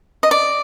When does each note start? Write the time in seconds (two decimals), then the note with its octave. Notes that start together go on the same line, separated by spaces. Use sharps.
0.23 D#5
0.31 D5